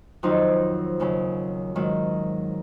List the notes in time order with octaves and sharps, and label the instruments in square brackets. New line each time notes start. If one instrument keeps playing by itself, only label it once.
[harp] F2 D#3 F#3 C4 D#4
D#2 C#3 F#3
G#2 D#3 F#3